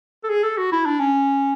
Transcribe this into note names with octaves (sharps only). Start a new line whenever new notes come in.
A4
G#4
A4
F#4
E4
D4
C#4